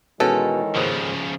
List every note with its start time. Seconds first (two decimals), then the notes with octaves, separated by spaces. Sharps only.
0.20 B2 D#3 E3 G#3 C#4 A4
0.76 D#2 G#2 C#3 F3